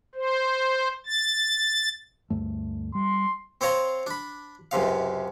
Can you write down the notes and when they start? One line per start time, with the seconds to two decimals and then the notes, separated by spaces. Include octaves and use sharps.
0.15 C5
1.06 A6
2.30 D2 G2 A3
2.95 G3 C6
3.61 C4 C5 C#5 F5 A#5 C6
4.07 D4 B5
4.71 C#2 F#2 C3 F5